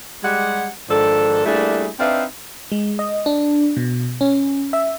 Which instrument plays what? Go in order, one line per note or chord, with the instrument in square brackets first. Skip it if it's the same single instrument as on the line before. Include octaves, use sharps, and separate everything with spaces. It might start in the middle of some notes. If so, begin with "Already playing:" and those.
[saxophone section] G3 G#3 G4 F#5
G#2 D#3 F3 D4 A4
G3 A3 A#3 D4 E4 G#4
C4 D4 D#4 B4 E5 F5
[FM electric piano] G#3
D#5
D4
B2
C#4
E5